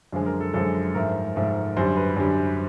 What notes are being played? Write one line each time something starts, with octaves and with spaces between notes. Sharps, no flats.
F#2 D3 F3 G#3
A#4
A4
F#2 D3 F3 G#3 A4
G#2 F3 A3 A#4
G#2 F3 A3
F#2 D3 G3 C5
B4
F#2 D3 G3